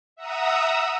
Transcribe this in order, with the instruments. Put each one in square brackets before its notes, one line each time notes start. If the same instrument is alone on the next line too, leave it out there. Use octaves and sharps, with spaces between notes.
[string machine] E5 F#5 A#5 D#6 E6